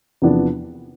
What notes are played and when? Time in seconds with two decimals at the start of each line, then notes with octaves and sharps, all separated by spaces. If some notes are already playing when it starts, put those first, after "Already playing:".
0.22 E2 C3 F3 B3 D4